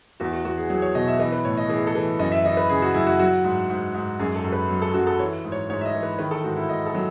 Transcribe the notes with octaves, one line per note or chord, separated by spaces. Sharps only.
E2 F#4
F#4
E2 F#4
G#4
F#3 G#4
C#5
B2 D#5
E5
E3 D#5
B4
A2 C#5
D#5
E3 G#4
A4
E3
F#2 D#5
E5
E3 D#5
B4
C#3 G#4
F#4
F#2 E4
F#4
F#3 F#4
G#2
G#2
G#2
F#2 G#4
A4
F#2
B4
F#3
A4
F#2 F#4
A4
E3 C#5
G#2
C#5
G#2 C#5
E5
D#5
E3
B4
D#3 B4
A4
G#2 F#4
E4
G#2 D#5
A4
F#3